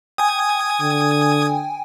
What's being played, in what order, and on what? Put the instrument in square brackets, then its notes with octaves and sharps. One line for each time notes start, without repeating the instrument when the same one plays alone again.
[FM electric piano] G5 G#5 [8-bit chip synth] D#6 G#6
[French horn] D3